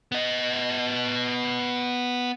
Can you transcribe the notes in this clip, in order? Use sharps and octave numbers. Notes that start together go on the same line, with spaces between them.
B3 D#5